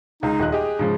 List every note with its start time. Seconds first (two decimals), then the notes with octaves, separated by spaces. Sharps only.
0.23 C#2 D#4
0.39 D#1 D#5 F#6
0.52 G4 G#4 D#5
0.79 G#2 C#3 F3